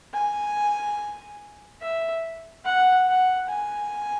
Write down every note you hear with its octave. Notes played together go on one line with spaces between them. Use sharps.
G#5
E5
F#5
F#5
G#5